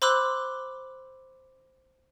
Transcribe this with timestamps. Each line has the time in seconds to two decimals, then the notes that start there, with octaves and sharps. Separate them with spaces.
0.02 C5 B5 C6 D6 E6 F#6